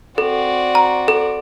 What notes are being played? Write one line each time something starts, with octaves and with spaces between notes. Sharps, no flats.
C4 F#4 A4 D5
A#5
A4